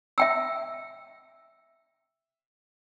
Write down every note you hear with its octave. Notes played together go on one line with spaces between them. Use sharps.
E5 G5 E6